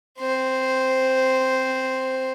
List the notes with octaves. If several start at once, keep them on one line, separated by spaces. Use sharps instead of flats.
C4 C5